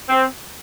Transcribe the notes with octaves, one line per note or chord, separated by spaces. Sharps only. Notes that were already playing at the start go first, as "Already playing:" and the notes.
C4